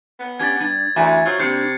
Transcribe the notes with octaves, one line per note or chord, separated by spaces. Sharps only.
B3
C#4 D4 G4 G#6 A6
G3 D4
D2 E3 E5 G#5
F#3 F4 C5
C3 A#3 B3 D4 G6 C7 C#7